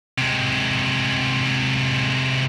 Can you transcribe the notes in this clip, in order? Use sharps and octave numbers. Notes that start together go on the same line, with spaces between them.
C3 G#3